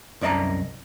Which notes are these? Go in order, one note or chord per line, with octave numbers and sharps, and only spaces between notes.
C2 F#2 D5 D#5 A5 A#5